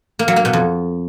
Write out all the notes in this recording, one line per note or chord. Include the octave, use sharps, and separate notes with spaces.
A#3
F#3
A#3
B2
F2